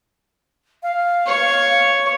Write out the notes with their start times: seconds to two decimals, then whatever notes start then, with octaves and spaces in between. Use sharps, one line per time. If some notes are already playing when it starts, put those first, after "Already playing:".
0.83 F5
1.26 C#5